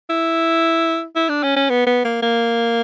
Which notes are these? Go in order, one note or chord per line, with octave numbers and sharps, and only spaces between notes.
E4
E4
D4
C#4
C#4
B3
B3
A#3
A#3